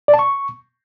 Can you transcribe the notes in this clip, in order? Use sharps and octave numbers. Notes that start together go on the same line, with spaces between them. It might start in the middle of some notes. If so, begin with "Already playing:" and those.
D5
A5
C#6